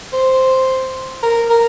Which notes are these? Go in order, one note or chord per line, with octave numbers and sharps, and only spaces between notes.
C5
A#4
A#4